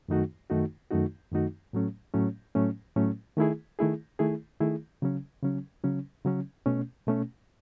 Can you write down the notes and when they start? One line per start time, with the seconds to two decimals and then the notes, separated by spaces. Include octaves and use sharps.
0.09 F#2 D#3 A3 D#4 F#4
0.50 F#2 D#3 A3 D#4 F#4
0.91 F#2 D#3 A3 D#4 F#4
1.32 F#2 D#3 A3 D#4 F#4
1.73 A2 F#3 A3 C#4
2.14 A2 F#3 A3 C#4
2.55 A2 F#3 A3 C#4
2.96 A2 F#3 A3 C#4
3.37 D#3 A3 E4 G#4
3.79 D#3 A3 E4 G#4
4.19 D#3 A3 E4 G#4
4.60 D#3 A3 E4 G#4
5.02 C#3 F#3 C#4
5.43 C#3 F#3 C#4
5.84 C#3 F#3 C#4
6.25 C#3 F#3 C#4
6.66 B2 A3 C#4
7.07 B2 A3 C#4